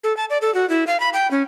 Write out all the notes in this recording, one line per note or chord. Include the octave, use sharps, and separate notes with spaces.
A4
A5
D5
A4
F#4
E4
F5
B5
G5
C#4